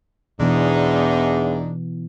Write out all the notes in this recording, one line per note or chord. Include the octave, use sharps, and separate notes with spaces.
E2 G#2 B2 E3 B3 D4 D#4